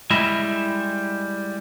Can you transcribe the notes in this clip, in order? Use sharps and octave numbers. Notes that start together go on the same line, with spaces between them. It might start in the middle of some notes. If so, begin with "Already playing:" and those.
G3 G#3 E4 D#5 E5